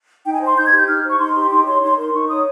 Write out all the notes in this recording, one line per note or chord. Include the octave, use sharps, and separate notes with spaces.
D#4 G5
G#5
C5 C6
D#4 G6
G#6
G4
G6
D#4 F6
C5
C#6
D#4 C6
G4 C6
D#4 C6
C#5 C6
D#4 C6
A#4 C6
D#4 C#6
C#5 D#6